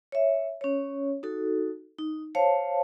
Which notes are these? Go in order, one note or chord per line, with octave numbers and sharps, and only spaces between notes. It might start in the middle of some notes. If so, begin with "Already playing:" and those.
C#5 E5
C#4 C#5
D#4 F#4 A4
D#4
C5 C#5 F5 A5